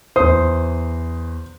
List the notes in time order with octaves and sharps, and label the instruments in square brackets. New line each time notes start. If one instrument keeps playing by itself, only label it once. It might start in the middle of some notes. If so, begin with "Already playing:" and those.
[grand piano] E2 D#6 [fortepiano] C5